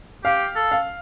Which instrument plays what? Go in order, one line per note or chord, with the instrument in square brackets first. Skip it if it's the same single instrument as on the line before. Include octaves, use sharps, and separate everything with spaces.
[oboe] G4 [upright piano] F5
[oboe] A4
[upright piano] F5